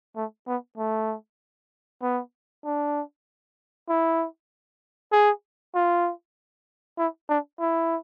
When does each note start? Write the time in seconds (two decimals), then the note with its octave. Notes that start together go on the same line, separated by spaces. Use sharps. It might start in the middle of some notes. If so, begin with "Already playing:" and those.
0.16 A3
0.47 B3
0.78 A3
2.02 B3
2.65 D4
3.89 E4
5.12 G#4
5.75 F4
6.98 E4
7.29 D4
7.60 E4